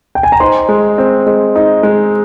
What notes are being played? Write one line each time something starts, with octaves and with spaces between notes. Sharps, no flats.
G5
G#5
A#5
D#4 C5 C6
G#3
C4
G#3
D#4
G#3